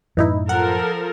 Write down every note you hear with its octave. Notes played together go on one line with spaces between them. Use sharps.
F#2 A2 E3 D#4 E4
F3 A4 A#4 F#5